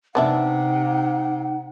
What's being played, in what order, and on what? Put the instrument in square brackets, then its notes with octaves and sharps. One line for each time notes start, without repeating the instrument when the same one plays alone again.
[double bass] C3 [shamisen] B3 D4 E5 [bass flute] D#4 [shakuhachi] F#5